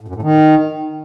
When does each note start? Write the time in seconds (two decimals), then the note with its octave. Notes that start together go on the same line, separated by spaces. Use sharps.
0.01 A2
0.08 F#2
0.15 A2
0.22 D#3